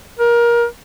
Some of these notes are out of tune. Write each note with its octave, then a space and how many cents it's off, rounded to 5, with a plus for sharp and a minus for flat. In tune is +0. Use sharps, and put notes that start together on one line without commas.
A#4 +25